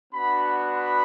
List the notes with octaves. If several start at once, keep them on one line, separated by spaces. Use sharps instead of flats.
B3 D4 F#4 B5
B5